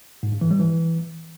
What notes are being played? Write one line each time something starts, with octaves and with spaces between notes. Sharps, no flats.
G#2
G2
E3
G3
E3